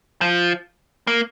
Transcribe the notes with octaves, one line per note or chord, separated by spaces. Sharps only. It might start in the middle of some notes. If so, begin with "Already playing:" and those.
F3
A#3